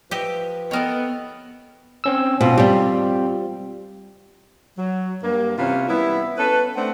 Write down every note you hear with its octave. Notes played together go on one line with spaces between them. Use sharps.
F3 G4 B4 D#5 E5
B3 A4 A#4 C#5 D#5 G5 D#6
C4 C#4 E6
B2 C4 F4
G3 G4
F#3
G2 A#3
C3 E3 B3 C#4 F4
G3 B3 E4
B3 C#4 A4 B4
A3 C4 D4 F#5